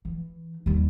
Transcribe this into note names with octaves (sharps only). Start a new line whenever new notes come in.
E3
D#2 G3